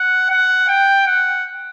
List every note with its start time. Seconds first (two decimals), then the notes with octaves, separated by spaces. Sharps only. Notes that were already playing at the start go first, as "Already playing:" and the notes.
Already playing: F#5
0.30 F#5
0.68 G5
1.07 F#5